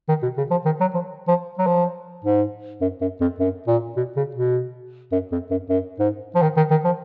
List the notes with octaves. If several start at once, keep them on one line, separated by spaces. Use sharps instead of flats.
D#3
B2
C#3
F3
D#3
F#3
F3
F3
F#3
F3
G#2
F#2
F#2
F2
F#2
A#2
B2
C#3
B2
F#2
F2
F#2
F#2
G#2
F3
D#3
D#3
D#3
F3